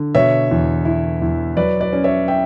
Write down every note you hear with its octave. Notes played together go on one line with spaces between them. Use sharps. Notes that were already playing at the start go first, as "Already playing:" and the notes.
Already playing: D3
B2 C#5 E5
E2
E4
E2
F#3 B4 D5
B4 D5
C#4
C#5 E5
E5 G5